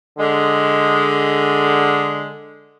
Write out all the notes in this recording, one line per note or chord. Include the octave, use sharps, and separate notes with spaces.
D3 G#3